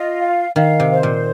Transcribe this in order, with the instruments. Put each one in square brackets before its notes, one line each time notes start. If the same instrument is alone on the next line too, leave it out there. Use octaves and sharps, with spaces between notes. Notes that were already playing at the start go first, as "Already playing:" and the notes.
Already playing: [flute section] F4 D#5
F5
[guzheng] D#3 [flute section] F5
[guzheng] C3
[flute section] C5
[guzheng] A#2